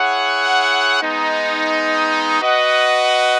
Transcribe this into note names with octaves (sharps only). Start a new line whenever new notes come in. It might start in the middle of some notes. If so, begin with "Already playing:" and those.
Already playing: E4 G#4 C#5 F#5
G#3 B3 D#4
F#4 B4 D#5 F#5